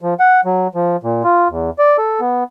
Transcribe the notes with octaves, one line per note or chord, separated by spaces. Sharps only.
F3
F#5
F#3
F3
A#2
F4
E2
D5
A4
B3